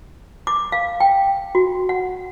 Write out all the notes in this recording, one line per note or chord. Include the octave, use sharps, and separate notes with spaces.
D6
F5
G5
F#4
F#5